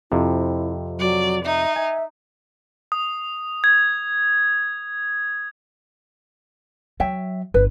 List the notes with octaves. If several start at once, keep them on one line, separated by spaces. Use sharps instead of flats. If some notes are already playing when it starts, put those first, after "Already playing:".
F2 C3 E4
F#3 D5
D#4 E5
E5 G#5
D#6
G#6
F#3 C#5 E5 G5
G1 B4